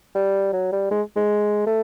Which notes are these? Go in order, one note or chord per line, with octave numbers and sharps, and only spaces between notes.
G3
F#3
G3
G#3
G#3
A3